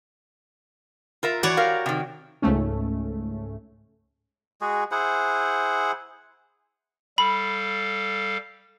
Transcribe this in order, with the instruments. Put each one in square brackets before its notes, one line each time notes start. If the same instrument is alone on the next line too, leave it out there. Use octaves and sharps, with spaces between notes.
[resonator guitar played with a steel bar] F4 A#4 E5
[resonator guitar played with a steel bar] E3 [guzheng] F#4 C#5 D5
[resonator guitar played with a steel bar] G4 A#4 F5
C3 D#3
[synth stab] C#2 G#2 A3 C#4
[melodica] G#3 F#4 G#4
E4 G#4 C5 F#5
[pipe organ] G3 A4 F5 [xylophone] B5